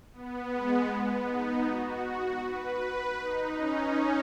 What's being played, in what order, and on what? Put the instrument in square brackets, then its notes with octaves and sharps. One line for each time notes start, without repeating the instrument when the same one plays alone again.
[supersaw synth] B3
G#3
B3
D#4
F#4
B4
D#4
C#4